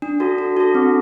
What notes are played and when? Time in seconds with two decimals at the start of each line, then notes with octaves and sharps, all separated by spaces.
0.02 D4
0.20 F#4 A4
0.38 D4
0.57 F#4 A4
0.75 C4